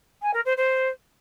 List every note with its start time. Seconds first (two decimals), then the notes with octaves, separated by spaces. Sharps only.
0.22 G#5
0.34 A#4
0.45 C5
0.57 C5